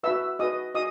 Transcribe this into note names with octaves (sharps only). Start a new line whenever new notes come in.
F#4 B4 E5 E6
F#4 B4 D#5 D#6
F#4 D#5 D#6